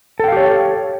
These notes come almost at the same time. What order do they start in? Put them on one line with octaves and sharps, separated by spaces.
A4 G5 F5 G4 C#5